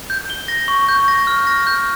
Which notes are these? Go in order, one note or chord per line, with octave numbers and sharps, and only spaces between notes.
G6
G7
A#6
C#6
G6
A#6
F6
A#6
G6